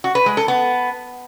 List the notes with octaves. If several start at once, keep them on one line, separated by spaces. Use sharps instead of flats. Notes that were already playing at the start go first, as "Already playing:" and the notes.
F#4
B4
G#3
A4
B3